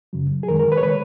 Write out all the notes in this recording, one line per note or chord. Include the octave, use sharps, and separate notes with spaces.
F#2 C#3 F#3
G#4
F#2 D#3 G#3 A#4
A#4
B4
C#5
D#3 G#3 B4